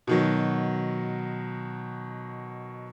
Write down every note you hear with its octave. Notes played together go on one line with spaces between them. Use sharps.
B2 D#3 F#3